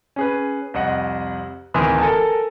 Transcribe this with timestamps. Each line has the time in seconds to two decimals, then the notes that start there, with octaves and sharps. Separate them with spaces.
0.16 C#4 G#4 B4
0.74 C2 F2 D#5 F#5
1.74 D1 D#3 E3 C6 D#6
1.99 A4 A#4 G#5 A5